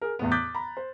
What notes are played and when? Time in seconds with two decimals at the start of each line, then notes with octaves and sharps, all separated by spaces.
0.02 G#4 A#4
0.19 E2 A2 B3
0.32 D6 D#6 F#6 G6 A6 B6
0.55 A#5 B5
0.77 C5